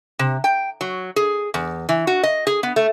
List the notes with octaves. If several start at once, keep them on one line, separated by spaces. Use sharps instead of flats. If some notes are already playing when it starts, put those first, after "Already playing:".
C3
G5
F#3
G#4
E2
E3
F#4
D#5
G#4
B3
A3